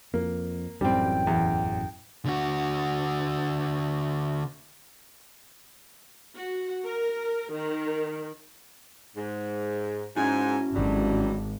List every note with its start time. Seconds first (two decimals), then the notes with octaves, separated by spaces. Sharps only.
0.14 F2 A#3
0.81 A1 F#2 A2 G3 C4 G5
1.27 E2
2.25 D3 F#4
6.35 F#4
6.85 A#4
7.53 D#3
9.16 G#2
10.17 G#2 C#4 E4 F#4 G#5
10.75 G#1 D3 F#3 G3